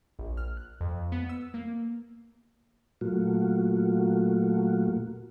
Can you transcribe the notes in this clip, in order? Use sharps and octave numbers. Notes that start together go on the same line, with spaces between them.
A#1
F6
F#6
F2
B3
E6
A#3
A#2 F#3 A3 A#3 F4 F#4